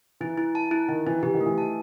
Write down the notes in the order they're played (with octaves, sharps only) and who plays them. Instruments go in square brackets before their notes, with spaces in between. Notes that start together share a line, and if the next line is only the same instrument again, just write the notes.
[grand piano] E3 [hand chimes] E4
[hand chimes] E4
A5
E4
[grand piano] D#3 [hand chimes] E4
[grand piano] E3 [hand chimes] E4
[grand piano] E3 [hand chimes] G4
[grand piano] D#3
[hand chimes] A3
[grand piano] E3
[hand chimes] A5